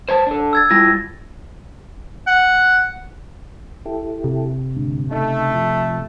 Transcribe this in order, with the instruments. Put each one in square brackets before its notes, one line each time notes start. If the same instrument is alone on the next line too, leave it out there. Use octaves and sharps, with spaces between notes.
[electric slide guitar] C5 C#5 A5
D4 A4
[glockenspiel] E6 G#6 A6
[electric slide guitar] G3 E4 F4 [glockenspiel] A#6
[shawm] F#5
[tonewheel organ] E4 G4 A4
[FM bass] C3
[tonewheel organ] G#2 D3
[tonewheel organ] C#3 D#4 [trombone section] A3
[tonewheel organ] F3